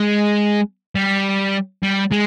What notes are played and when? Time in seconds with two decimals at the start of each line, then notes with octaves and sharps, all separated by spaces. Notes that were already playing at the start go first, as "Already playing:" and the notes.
Already playing: G#3
0.96 G3
1.83 G3
2.11 G#3